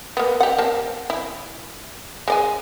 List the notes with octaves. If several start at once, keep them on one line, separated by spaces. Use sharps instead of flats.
A#3 B3
G4 F#5
A#3 C4 A5
E4
G#3 D5 G#5